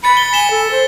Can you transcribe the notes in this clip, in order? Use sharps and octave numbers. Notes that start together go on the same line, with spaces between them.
B5 A6 C#7
G7
G#5 B6 E7 G7
A4
C5